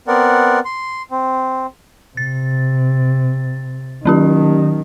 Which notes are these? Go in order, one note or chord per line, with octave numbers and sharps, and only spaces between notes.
B3 C4 A#4 D5 F#5
C6
C4
C3 A6
D#3 F#3 C#4 G4